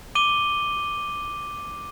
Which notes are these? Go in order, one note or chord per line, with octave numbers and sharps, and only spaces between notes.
D6 D#7 G7